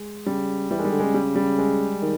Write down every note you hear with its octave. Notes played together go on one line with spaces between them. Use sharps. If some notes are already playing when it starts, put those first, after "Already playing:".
Already playing: G#3
C#3 G3
E3 G3
G#3
D#3 G3
D3
G#3
C#3
G3
G3
G#3
D#3